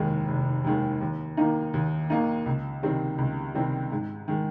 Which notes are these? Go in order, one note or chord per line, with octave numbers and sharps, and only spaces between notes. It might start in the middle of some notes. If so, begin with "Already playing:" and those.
Already playing: F1 D#2 D#3 G#3
F1
D#2 D#3 G#3
D#2
D#3 A#3 D#4
D#2
D#3 A#3 D#4
C#2
C3 D#3 G3 C4
C#2
C3 D#3 G3 C4
G#2
D#3 G#3